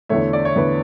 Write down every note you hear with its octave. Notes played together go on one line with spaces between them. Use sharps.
E2 D3 A3 C#5 E5
D5
C#5
E2 D3 A3 B4